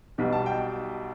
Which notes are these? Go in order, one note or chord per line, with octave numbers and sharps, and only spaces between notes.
B1 B2 G3
A5
G5